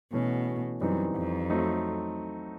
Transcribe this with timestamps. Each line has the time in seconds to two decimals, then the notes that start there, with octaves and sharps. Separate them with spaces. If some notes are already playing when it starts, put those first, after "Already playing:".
0.12 B2 E3 A3 C#4 F#4
0.81 F#2 E3 G3 C4 D#4
1.16 F2
1.50 F#3 A3 C4 D#4